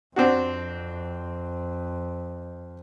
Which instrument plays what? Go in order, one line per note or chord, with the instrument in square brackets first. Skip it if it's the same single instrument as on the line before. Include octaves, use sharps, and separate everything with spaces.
[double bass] F2 [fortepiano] C4 D4 F#4